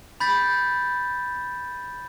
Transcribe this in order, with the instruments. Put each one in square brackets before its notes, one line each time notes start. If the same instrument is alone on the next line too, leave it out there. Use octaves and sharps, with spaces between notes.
[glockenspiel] B5 G6 A6 B6